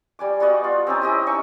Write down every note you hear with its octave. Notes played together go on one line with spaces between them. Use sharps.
G3 G#5 D6
G3 B3 F#4 D#5
F4
C4 C#4 D#4 D#6
E4 G4 D#5
C#4 D#4 C#6